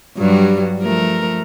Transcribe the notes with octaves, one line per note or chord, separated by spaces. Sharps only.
G2 F#3 G3
F3 A3 A#4